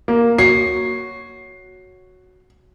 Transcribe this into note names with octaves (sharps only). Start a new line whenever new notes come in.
A#3
F#4 C#5 C7